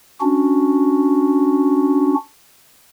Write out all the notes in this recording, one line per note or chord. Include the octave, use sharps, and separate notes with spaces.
C#4 D4 F#4